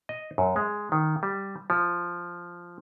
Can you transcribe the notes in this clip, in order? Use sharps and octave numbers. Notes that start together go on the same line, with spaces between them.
D#5
F#2
G#3
D#3
G3
F3